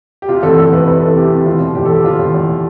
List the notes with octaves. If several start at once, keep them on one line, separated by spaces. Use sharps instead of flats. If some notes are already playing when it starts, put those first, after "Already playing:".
G4
C3 F4
E2 A4
E2 A4
E2 B4
C3 B4
E3 A4
C3 G4
C3
E2 F4
B2
E2 G4
A4
E2
G4
E2 F4
E2
E2